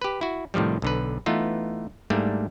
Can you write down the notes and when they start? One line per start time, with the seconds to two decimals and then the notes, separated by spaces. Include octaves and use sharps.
0.02 G4 B4
0.21 E4 F#4
0.54 A2 C3 D#3 F3 G3
0.82 B1 D3 B4
1.26 E3 A3 B3 D#4 F4
2.10 G#2 G3 A3 A#3 D4